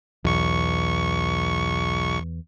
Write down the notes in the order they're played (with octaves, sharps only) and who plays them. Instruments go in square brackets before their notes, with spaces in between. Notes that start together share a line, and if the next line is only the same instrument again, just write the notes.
[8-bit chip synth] B1 C#6 [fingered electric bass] E2